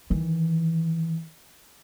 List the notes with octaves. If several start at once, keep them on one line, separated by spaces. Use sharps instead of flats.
D#3 E3